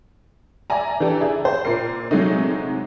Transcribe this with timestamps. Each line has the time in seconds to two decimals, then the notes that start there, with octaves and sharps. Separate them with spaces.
0.70 D5 E5 G#5 A#5
1.00 E3 D4 G4 A4
1.21 E4 G#4
1.45 C5
1.65 A#2 A#4 C7
2.11 C3 F#3 G#3 A3 D#4